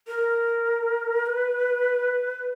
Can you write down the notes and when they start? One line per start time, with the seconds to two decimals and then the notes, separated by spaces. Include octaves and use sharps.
0.07 A#4
1.26 B4